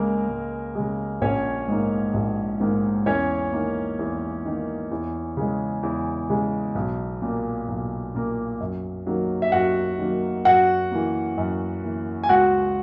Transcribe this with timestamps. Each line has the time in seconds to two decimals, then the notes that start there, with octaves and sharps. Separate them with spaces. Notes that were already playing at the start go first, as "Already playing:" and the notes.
Already playing: C#2 C#3 G#3 A#3 A#4
0.29 C#2
0.75 C#3 G#3
1.21 A#1 C#4 C#5
1.68 G#2 D#3 A#3
2.14 A#1
2.60 G#2 D#3 A#3
3.06 E2 C#4 C#5
3.53 D#3 A#3
3.99 E2
4.45 D#3 A#3
4.91 E2
5.37 C#3 G#3
5.83 E2
6.30 C#3 G#3
6.75 B1
7.22 A#2 A#3
7.68 B1
8.15 A#2 A#3
8.60 F#2
9.06 D#3 F#3 A#3
9.42 E5
9.52 F#2 F#4 F#5
9.98 D#3 F#3 A#3
10.45 F#2 F#4 F#5
10.91 E3 A#3
11.38 F#2
11.84 E3 A#3
12.23 G#5
12.29 C#2 F#4 F#5